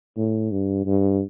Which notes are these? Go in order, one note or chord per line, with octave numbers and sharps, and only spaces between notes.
A2
G2
G2